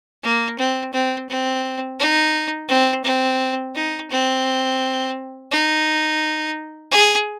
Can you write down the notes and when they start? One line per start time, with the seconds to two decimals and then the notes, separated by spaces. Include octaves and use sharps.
0.24 A#3
0.59 C4
0.93 C4
1.29 C4
2.00 D#4
2.69 C4
3.04 C4
3.75 D#4
4.11 C4
5.52 D#4
6.92 G#4